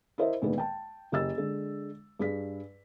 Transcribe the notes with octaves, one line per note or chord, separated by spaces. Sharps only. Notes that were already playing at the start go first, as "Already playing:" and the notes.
E4 A#4 C5 D#5 E5
D2 A#2 D#3 G#3 B3
G5 A5
F#1 G4 D#5 E6 A6
D3 G#3
G2 G#4 B6